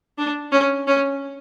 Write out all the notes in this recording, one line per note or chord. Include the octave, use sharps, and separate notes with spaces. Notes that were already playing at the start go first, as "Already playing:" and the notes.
D4
C#4
C#4